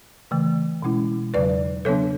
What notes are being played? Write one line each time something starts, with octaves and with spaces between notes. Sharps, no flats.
C#3 E3 A3
B2 G#3 C#4 E4
E2 C#3 F#3 B4 D5
C#3 F#3 B3 D4 A4 C#5